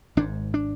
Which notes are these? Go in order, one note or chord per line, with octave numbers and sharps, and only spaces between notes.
G#1 G#2 D4
D4